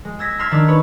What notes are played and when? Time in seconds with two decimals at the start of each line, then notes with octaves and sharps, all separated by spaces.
0.05 G#3
0.19 E6 G#6 A#6 B6
0.39 C6 E6 F6 G#6 B6 C7
0.51 D#3 D4 E6
0.68 B4 C#5